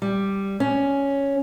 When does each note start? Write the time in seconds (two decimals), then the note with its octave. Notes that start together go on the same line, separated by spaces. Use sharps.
0.02 G3
0.60 C#4